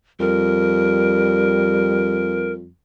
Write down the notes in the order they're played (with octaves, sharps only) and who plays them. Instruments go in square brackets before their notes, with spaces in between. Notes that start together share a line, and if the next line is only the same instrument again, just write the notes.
[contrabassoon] F2 [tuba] G3 [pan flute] A#4